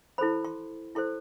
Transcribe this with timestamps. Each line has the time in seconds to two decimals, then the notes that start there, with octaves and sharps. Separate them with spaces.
0.18 E4 A4 C5 B5
0.45 C6
0.95 E4 A4 C5 C6